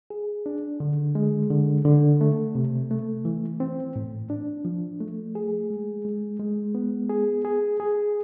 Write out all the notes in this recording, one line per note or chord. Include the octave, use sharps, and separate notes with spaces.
G#4
D4
D3
G#3
D3
D3
A3
C3
A3
E3
C4
A2
D4
F3
A3
G#4
G#3
G#3
G#3
B3
G#4
G#4
G#4